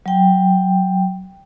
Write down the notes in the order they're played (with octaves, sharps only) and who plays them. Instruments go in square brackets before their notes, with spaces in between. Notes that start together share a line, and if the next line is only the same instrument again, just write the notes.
[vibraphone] F#3 G5